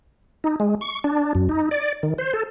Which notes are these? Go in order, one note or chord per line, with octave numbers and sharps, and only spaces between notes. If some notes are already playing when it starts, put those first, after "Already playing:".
D#4
G#3
C#6
D4
F#2
D#4
D5
D#3
C5
A4